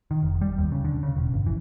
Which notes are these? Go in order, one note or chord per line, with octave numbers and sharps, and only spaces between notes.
D#3
F1
G3
D#2
C#3
D3
C#3
E1
G1
E3